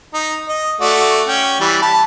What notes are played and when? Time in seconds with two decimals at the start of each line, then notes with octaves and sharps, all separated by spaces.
0.14 D#4
0.48 D#5
0.81 A3 F#4 D5
1.28 C#4 G5
1.60 E3 G3
1.82 A5 B5